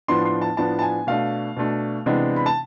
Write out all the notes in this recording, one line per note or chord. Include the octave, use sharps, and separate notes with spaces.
A2 F3 B3 D4 C6
C6
A5
A2 F3 B3 D4 A5
A5
G#5
B2 A3 D4 F5
B2 A3 D4
C3 E3 G#3 B3 D4
B5
A5